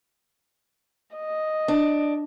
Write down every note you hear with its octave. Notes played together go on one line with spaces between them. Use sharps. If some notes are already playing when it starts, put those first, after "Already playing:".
D#5
D4